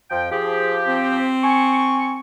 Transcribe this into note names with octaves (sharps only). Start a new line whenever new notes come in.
F2 F3 G5
F3 G4 G#4
C4
G#5 C#6